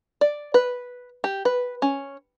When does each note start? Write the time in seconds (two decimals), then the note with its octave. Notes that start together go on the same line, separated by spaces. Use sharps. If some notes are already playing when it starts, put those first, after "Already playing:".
0.21 D5
0.54 B4
1.24 G4
1.45 B4
1.82 C#4